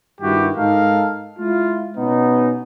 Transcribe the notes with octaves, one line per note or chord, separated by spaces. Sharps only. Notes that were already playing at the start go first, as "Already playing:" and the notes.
G2 D#3 E4 F#4 G4
G#2 D#4 A4 A#4 F5
G#3 E4 F4
B2 B3 C#4 D#4